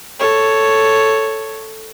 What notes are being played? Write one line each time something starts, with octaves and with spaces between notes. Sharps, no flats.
A4 C#5